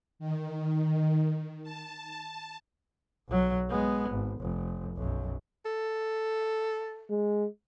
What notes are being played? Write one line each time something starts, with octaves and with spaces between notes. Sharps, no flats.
D#3
A5
B1 F#3
G#3 B3
G#1
F1
B1 F#2
A4
G#3